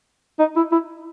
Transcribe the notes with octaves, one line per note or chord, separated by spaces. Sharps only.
D#4
E4
E4